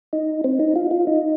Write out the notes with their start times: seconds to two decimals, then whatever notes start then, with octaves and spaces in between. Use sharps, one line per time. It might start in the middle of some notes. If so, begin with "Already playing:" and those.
0.13 D#4
0.44 C4
0.59 D#4
0.76 F4
0.91 F4
1.07 D#4